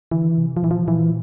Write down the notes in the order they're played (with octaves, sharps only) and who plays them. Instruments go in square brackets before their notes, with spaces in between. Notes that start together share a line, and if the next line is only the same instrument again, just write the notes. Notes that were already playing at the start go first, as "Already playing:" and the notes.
[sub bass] D3 [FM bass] E3
[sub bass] C3
[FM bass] F3
[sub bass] A#2 [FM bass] E3
[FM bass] F3
[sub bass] A#2 [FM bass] E3